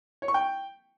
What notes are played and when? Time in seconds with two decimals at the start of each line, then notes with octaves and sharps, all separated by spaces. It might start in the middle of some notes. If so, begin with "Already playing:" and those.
0.22 C#5
0.28 C#6
0.34 G5